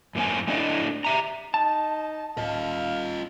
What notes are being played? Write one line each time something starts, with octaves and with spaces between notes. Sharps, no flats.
F#2 A#3 C4 G#5
A3 C4 D4 E4 D5 D#5
G4 E5 A#5
D#4 A5
D1 F4 D#5 F5